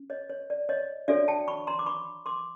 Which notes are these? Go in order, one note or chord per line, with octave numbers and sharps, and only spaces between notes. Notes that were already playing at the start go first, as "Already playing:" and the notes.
Already playing: C#4
C#5 D#5
C#5
D5
C#5 D#5
D4 F#4 A4 C#5 D5 E5
G5 A5
B5 C#6
A#5 C6
D6
B5 C#6
C6 D6